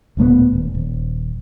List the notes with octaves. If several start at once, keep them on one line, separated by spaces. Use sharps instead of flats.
D1 A#2 A3 B3
D#1
D#1